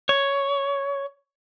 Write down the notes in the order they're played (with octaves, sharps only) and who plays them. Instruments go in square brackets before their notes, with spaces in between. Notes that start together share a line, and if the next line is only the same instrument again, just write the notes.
[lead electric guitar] C#5